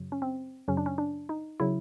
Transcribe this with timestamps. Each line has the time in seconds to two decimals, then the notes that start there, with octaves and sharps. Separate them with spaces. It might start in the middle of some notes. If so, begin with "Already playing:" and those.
Already playing: F#2 C#3 F#3
0.12 C#4
0.22 C4
0.68 F#2 C#3 F#3 C#4
0.77 D4
0.86 C#4
0.98 D4
1.29 D#4
1.60 C#3 F#3 E4